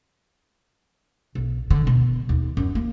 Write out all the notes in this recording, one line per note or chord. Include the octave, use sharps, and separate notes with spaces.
B1
D3
B2
D#2
F#2
A#3